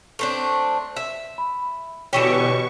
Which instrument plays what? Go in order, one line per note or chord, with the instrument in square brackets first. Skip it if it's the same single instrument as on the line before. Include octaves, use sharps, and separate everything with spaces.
[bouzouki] A3 C4 D4
E5
[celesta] B5
[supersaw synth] B2 C#6 [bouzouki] D3 E3 G4 [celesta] C#5 E7